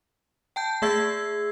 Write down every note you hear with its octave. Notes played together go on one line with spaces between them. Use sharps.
G5 A5 G6
A3 G#4 E5 E6 G#6 C7